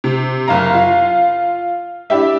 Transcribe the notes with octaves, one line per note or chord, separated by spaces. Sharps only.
C3
F#1 F5 A#5
F4
D4 E4 G4 E5